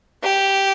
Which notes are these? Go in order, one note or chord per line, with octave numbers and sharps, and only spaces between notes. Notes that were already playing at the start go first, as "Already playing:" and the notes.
G4